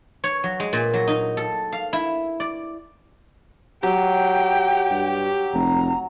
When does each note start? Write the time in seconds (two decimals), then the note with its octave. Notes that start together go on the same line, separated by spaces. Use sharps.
0.24 C#5
0.44 F#3
0.60 G#3
0.73 A#2
0.93 F#3
1.08 D#4
1.37 A4
1.72 F5
1.93 E4
2.40 D5
3.83 F#3 G4 G5
4.91 G2
5.53 F1 A#5